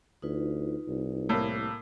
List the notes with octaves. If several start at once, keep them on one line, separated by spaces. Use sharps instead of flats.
D2 D#4 F4 B4
C2
A2 A#3